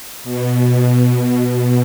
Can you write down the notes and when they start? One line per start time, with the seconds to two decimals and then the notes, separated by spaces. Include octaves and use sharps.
0.24 B2
1.13 B2